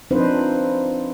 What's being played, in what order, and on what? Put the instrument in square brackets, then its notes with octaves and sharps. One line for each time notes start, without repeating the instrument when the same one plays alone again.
[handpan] F3 C4 D4 D#4 B4 C5